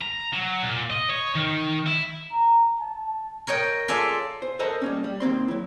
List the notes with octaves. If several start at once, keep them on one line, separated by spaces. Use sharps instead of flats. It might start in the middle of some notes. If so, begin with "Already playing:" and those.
A#5
F#3
A#2
D#5
C#5
D#3
E4
A#5
A5
A#4 C#5 D#5 G5
F4 G#4 A4 D5 E5
C5
A4 A#4 C5 D#5 F#5 A5
G3 A#3 C#4
G3
D#2 A#3 C4 C6
F#3 E4